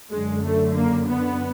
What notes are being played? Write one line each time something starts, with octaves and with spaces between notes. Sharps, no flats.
F#2 D3 G#3
A3
A#3
B3